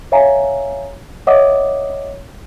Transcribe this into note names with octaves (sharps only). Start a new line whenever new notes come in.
C#5 E5 F5 G#5 A#5
C#5 D#5 E5 F#5 D6 D#6